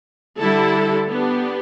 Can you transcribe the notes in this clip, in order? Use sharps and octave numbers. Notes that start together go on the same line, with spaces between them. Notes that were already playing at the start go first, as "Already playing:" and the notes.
D3 G3 E4 A4
B3 D4 G4